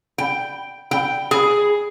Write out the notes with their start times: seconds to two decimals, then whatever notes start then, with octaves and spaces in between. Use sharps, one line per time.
0.18 G5
0.91 G5
1.31 G#4